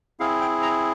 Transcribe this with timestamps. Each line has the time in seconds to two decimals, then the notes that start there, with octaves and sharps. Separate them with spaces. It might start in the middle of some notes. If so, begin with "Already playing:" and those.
0.20 C4 E4 G#4 F5
0.41 G5
0.62 A#5